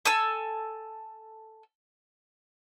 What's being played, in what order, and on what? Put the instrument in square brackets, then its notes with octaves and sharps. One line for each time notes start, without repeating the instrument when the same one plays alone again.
[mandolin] A4 G#5 E6